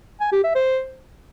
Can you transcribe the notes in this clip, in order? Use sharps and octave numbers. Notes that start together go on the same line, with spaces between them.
G#5
G4
E5
C5